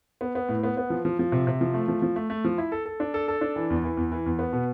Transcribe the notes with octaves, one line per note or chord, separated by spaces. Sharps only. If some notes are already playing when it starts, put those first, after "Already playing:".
B3
B3
A2
B3
B3
F3
F3
F3
C3
C3
F3
A3
F3
F3
A3
A3
F3
E4
A4
A4
D4
A4
A4
D4
E3
E2
E3
E2
E3
E2
B3
B2